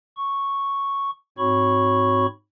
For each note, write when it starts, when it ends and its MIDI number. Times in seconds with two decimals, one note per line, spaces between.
0.17 1.10 85
1.38 2.26 44
1.38 2.26 60
1.38 2.26 66
1.38 2.26 73
1.38 2.26 83
1.38 2.26 85